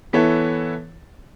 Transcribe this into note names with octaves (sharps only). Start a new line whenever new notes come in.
E3 B3 E4 A4 C#5